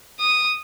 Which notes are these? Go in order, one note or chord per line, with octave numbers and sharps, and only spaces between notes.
D#6